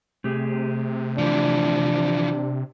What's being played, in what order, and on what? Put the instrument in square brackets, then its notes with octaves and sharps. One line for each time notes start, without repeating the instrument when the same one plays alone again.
[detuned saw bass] C3 [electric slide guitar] A3 G4 G#4
[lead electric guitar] E3 F3 [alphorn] D4